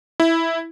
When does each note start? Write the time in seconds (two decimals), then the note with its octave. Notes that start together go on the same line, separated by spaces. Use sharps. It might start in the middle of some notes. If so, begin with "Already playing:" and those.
0.20 E4